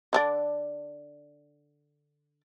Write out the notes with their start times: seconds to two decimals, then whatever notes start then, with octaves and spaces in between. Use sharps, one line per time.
0.13 D3 D4 D5